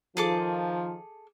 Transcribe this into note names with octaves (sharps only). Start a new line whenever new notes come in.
D#3 F3 G#4 A4 D6